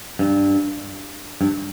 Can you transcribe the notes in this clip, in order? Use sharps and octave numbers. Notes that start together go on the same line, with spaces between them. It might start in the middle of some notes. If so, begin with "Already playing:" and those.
G2
G2